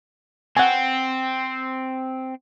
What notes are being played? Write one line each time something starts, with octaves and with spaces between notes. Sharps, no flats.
C4 F#5 G#5